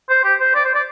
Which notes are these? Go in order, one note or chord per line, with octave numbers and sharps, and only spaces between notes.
C5
G4
C5
D5
C5
D5